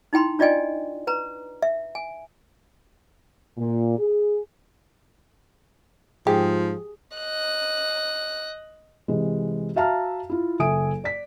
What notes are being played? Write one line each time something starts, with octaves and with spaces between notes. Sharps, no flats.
D#4 E4 G5 B5 C6
D4 F4 D5 D#5 G5 G#5
B4 A#5
E5
G#5
A#2
G#4
G#2 F3 G4 G#4
D#5 F#6
C3 E3 G#3
F#4 E5 F5 A5 A#5 F6
E4 F4
F#1 A4 E5 G#5 D#6 D7
D5 B6